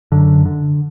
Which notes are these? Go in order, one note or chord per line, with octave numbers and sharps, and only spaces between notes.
F#2 D3
D3